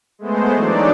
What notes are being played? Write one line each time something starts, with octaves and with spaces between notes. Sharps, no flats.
G#3 A3 B3 C5
E3 F#3 D4 D#4 D5